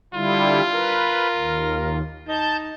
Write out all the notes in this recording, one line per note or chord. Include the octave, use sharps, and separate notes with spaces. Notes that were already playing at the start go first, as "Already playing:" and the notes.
D3 G3 E4 F4
A#4 B4
D#2
D#4 A5 G6